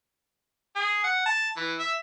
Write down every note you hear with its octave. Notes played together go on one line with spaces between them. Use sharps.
G#4
F#5
A5
E3
E5